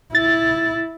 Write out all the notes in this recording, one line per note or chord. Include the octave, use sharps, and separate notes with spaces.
E4 A6